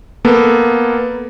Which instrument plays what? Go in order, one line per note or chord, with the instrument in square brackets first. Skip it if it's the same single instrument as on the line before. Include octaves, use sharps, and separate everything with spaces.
[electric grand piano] A#3 B3 A4